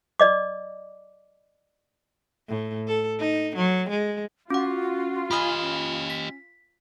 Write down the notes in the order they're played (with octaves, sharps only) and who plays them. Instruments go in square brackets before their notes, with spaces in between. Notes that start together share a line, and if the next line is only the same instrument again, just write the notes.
[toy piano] D5 D#5 D6
[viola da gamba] A2
A4
D#4
F#3
G#3
[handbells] C#4 F#5 [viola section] F4 [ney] F#4
[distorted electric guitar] G4 D#5 [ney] G#5 [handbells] B5 D#6 F6
[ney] C#4
[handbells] B6